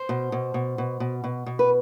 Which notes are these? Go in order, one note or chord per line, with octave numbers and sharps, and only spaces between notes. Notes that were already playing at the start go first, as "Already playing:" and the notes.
Already playing: C5
B2
B2
B2
B2
B2
B2
B2
B4